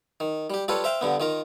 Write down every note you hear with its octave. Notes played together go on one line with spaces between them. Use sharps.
D#3
G3 G4
G3 F4 A4 B4 C#5
C5 E5 F5 G5
G2 D3 B3
D#3 F4 A#4